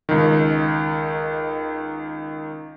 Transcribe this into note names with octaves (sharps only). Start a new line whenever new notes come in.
C#2 D#3